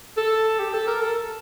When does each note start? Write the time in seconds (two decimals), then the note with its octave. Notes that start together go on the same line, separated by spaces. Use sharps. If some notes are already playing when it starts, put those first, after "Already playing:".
0.17 A4
0.59 G4
0.74 A4
0.87 A#4
1.01 A4